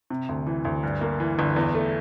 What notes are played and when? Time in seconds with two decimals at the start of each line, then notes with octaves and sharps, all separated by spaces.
0.10 C3
0.29 D2
0.47 E3
0.65 D2
0.83 G2
1.01 A#3
1.20 E3
1.39 G1
1.56 E2
1.75 A3